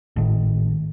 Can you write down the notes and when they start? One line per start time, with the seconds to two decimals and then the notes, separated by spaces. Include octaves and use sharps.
0.16 G#1 A2 D#3